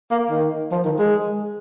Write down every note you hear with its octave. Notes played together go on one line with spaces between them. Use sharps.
A#3
D#3
F3
D#3
G#3